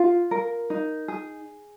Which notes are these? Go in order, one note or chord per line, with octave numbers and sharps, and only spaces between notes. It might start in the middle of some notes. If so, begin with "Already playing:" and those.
Already playing: F4
A#4
D#4
G#4